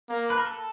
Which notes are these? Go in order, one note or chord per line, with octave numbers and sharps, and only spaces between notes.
A#3
B4
A#4
A4